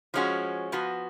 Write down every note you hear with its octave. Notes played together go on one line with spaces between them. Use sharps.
F3 G#3 C#4 F#4
F3 B3 F#4